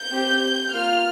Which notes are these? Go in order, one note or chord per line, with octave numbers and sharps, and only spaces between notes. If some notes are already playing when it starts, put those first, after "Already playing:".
Already playing: G6
C4 G4
A#3 F4 F6